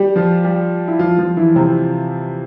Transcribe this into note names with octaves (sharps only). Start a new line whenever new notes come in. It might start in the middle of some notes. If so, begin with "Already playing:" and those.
Already playing: G3 G4
F3 F4
G3 G4
E4
F3 F4
F3 F4
E3 E4
C3 C4